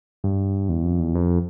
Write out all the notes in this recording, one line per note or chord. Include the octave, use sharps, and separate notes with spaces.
G2
E2
F2
E2
F2